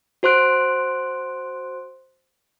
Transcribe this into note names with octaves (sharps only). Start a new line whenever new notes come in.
F#4 C5 C6 F#6 D7